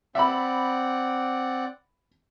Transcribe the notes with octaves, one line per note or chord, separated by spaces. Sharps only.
C4 D5 E5 F#5 B5